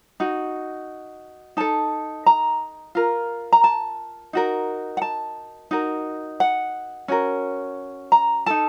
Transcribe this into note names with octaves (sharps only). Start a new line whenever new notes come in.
D#4 F#4
D#4 A4 A5
A#5
F4 A#4
A#5
A5
D#4 F#4 A#4
F#5
A5
D#4 F#4 A#4
F#5
C#4 F#4 A#4
A#5
D#4 A4 A5